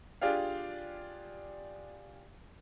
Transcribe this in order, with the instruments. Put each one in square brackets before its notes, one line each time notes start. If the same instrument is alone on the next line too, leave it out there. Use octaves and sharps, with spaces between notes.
[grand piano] D4 F4 G4 G#4 F5